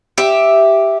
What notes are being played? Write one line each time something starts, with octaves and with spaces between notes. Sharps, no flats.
G4 E5